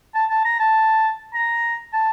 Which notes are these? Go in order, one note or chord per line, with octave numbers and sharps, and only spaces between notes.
A5
A5
A#5
A5
A#5
A5